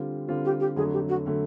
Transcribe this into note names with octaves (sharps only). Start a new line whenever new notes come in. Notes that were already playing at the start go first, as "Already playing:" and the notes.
Already playing: D3 G3 C4 F4
D3 G3 C4 F4
G4
G4
F2 D3 F#3 A3 G#4
G4
F#4
D3 F#3 A3